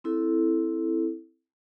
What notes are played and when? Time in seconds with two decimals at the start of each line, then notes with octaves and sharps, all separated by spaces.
0.04 C4 E4 A4